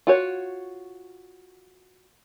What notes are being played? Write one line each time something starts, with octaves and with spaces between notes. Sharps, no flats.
F4 F#4 C#5